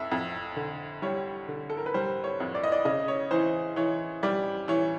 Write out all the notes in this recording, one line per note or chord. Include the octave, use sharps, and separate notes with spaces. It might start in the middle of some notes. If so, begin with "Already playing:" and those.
Already playing: F2 E5
F2
D3
G3 C#5
D3
A4
A#4
B4
G3 C5
C#5
F2
D5
D#5
D5
C#3 D#5
C#5
E3 C5
E3 C#5
G3 D5
E3 C#5